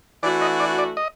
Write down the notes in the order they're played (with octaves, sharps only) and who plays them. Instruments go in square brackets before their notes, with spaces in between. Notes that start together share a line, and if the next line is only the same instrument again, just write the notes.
[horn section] E3 A3 D4 F#4 [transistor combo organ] D5
[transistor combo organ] D#5
D5
D5
D#5